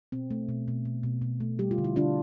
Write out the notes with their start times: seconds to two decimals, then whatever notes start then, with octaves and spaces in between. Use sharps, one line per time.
0.12 B2 C4
0.31 A3
0.49 B2
0.68 B2
0.85 B2
1.03 B2
1.22 B2
1.40 A3
1.59 G3 G4
1.71 F4
1.78 D3
1.84 E4
1.96 D3 D4 F4